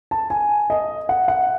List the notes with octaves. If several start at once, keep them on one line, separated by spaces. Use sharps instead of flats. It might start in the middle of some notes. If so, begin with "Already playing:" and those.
A5
G#5
D#5
F#5
F#5